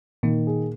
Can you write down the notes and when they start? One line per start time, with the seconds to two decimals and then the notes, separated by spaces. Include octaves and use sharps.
0.23 A#2 D#3 A#3
0.47 G#4